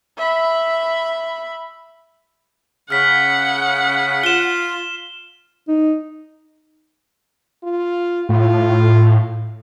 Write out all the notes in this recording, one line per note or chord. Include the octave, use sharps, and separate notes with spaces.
E5 B5
C#3 F#5 F6 B6
F4 E7 G7
D#4
F4
A2 F4